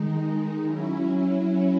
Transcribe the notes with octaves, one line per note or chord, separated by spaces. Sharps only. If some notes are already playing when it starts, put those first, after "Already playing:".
Already playing: D#3 G#3 D#4
F#3 C#4 E4